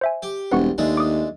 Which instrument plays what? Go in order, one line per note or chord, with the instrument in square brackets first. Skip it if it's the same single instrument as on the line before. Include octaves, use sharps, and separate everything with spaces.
[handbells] C5 E5 G#5
[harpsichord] G4
[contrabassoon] E1 [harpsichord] C2 [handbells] B4 F#5 C#6
[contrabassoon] D#2 [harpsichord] G#3 A3 D4
[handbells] D6 D#6